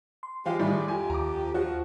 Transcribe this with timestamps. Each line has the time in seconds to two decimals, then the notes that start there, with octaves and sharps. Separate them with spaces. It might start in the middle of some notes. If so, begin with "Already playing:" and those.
0.23 C6
0.46 F3 G#3 G4 F5
0.59 A2 D#3 G3 G#3 D5
0.88 F2 G4 G#5
1.10 D#2 A#5 D6
1.54 F3 F#4